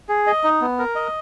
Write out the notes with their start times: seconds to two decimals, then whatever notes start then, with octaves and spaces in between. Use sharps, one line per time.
0.09 G#4
0.27 D#5
0.44 D#4
0.62 B3
0.79 A#4
0.95 D#5